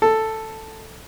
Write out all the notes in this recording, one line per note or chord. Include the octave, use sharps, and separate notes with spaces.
A4